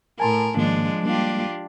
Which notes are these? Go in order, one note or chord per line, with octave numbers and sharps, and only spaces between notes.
A2 A#4 G#5 A5 C6
G#2 D#3 F3 G#3 A#3 D4
G3 G#3 A#3 D4 F4 G4